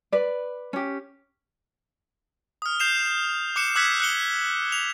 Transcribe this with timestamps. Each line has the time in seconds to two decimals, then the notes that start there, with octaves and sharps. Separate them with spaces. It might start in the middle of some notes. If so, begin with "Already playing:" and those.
0.12 B4 D5
0.73 C#4 G4
2.62 D#6 F6
2.80 G6 C7 E7 F7
3.56 D6 F#6 C#7 E7
3.76 D6 E6 F#6 G#6 B6 C#7
4.00 F#6 C#7 G7
4.72 F7